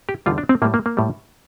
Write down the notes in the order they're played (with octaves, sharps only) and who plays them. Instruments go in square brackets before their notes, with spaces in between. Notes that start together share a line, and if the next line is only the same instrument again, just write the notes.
[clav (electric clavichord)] G4
E2 D3 G3 F4
D4
C4
A2 G3 A#3
A#3
A#3
A2 G3